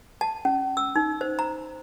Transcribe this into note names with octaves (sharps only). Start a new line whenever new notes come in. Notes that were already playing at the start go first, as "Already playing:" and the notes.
A5
C#4
E6
D#4
C5
A#5